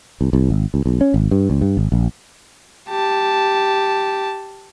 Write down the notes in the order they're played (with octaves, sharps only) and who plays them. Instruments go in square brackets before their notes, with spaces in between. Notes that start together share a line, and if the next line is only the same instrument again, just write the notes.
[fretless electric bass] C2
C2
G#1
C#2
B1
C#4
G#1
G2
C#2
G2
G#1
A#1
[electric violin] G4 A5